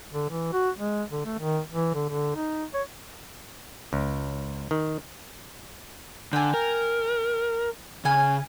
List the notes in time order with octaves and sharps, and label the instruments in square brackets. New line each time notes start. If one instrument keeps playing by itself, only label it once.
[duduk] D3
E3
F#4
G#3
D3
A3
D#3
E3
D3
D3
D#4
C#5
[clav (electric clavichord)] C#2
D#3
[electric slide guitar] D3 [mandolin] G5 G#5
[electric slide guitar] A#4
[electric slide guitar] C#3 [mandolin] C#4 G#5